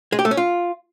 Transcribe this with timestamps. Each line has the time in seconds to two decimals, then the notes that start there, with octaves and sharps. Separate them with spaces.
0.12 G#3
0.19 G4
0.25 A3
0.31 C#4
0.37 F4